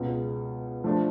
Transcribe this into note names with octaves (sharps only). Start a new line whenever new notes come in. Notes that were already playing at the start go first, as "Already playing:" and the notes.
Already playing: C#2 B2 G#3
F3 A3 D4